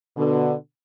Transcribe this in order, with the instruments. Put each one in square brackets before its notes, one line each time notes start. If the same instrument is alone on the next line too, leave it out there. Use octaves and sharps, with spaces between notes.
[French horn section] B2 D3